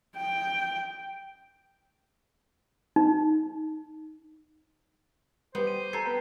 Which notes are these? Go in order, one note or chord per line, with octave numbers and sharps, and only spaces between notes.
G5
D#4
G3 B3 G4 C5
D#7
A4 A5 A#5 G#6 C7 D#7
B3 B4 G5